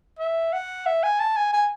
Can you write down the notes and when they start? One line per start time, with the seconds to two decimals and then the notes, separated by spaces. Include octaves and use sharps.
0.19 E5
0.53 F#5
0.86 E5
1.03 G#5
1.20 A5
1.37 G#5
1.53 G#5